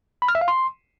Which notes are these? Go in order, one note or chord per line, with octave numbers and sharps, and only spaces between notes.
B5
F6
E5
F5
C6